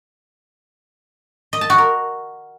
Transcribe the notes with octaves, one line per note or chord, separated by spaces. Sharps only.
D#5
A5
F#4
A#4